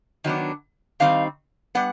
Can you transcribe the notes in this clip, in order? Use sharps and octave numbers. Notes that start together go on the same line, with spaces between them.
D#3 F#3 B3 D4
D#3 G3 C4 D#4 F5
G3 B3 F#5